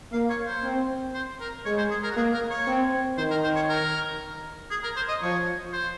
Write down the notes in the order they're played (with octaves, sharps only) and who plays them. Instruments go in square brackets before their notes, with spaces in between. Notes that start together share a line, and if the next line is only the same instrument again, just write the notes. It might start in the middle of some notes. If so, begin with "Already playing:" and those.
[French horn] A#3 [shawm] F5
[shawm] C#5
C5
[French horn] C4
[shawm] C5
A#4
[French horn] G#3 [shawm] C#5
[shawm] C5
G#4
A#4
F#4
[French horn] A#3 [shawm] G#4
[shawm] A#4
C#5
[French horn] C4
[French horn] D#3 [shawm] C5
[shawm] A#4
C5
C#5
A#4
G#4
A#4
C5
D#5
[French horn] F3 [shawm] C#5
[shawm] C5